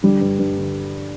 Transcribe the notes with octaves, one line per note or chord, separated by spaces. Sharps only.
D3 G3
G2
G2
D3